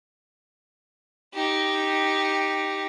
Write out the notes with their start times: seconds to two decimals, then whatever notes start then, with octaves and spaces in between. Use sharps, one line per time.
1.33 D#4 G4